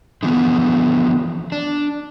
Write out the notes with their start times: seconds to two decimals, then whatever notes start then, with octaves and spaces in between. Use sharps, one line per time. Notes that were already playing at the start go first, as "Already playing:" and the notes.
0.23 D3 E3 F3 B3
1.52 D4